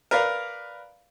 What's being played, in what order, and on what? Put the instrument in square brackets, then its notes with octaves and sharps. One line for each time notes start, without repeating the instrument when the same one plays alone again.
[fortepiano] A#4 B4 D5 F5